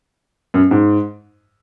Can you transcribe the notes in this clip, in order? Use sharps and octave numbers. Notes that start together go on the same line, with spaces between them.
F#2
G#2